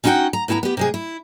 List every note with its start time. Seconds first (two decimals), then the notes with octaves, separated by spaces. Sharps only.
0.04 C#4 D#4 E4 F#4 F#5 G5
0.33 A#5
0.48 A2 B3 E4 F#5 A#5
0.63 B3 G4
0.77 C3 G#3 G#4
0.94 E4